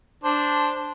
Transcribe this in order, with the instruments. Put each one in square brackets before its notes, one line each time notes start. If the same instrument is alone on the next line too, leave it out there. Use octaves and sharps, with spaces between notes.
[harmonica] D4 C5